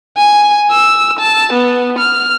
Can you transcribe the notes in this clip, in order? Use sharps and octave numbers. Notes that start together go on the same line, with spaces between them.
G#5
E6
A5
B3
F6